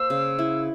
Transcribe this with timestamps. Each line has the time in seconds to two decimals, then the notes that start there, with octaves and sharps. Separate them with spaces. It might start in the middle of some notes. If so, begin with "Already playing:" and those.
Already playing: A#3 C5 E6
0.10 C#3
0.39 E4